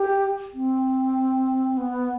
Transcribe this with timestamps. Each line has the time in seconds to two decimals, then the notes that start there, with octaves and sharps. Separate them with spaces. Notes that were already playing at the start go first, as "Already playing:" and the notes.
Already playing: G4
0.54 C4
1.77 B3